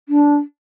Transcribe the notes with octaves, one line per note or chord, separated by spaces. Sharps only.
D4